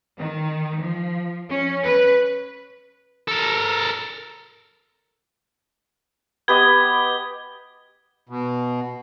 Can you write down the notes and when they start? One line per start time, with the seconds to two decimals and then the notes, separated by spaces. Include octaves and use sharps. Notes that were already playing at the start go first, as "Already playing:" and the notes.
0.17 D#3
0.80 F3
1.49 C#4
1.83 B4
3.28 A4 A#4
6.48 B3 G4 D#5 G#6 G7
8.29 B2